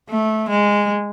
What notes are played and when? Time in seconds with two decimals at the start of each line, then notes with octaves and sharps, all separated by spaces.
0.10 A3
0.49 G#3